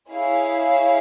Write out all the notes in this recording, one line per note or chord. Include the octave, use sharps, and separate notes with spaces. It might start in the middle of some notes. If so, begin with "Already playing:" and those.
E4 G#4 C#5 F5